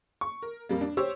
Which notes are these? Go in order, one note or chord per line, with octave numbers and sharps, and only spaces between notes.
C#6
A#4
F2 G3 A#3
D4
G4 C5 C#5 E6